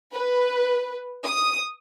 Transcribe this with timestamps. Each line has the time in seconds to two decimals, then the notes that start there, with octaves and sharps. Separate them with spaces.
0.12 B4
1.23 D#6